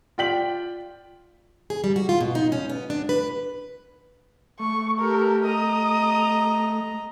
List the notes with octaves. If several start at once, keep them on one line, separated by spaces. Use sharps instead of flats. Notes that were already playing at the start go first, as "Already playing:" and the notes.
F4 D5 G5 B6 F#7
G#4
G3
F#4
F4
B2
D#4
C#4
B3
D4
B4
A3 C#6
G4 A4 A#4
D#5 A#5 D#6